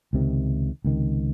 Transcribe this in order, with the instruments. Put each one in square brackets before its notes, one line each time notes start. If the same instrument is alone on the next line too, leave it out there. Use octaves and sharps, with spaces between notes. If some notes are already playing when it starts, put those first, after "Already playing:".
[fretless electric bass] C#2 C3 D#3
C#2 C3 D#3